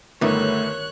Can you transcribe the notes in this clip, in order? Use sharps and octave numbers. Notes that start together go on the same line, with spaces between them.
G1 D#3 G3 A3 B3 C#5 E5 F#6